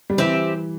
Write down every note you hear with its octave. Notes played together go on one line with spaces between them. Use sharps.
G3
E3 C4 G4 E5